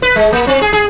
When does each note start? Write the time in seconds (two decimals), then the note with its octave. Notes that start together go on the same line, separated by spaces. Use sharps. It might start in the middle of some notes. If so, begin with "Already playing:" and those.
0.02 B4
0.16 G#3
0.32 A#3
0.47 C4
0.61 G#4
0.73 G#4